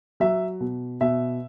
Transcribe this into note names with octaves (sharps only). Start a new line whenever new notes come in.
F#3 E5
B2
B2 E5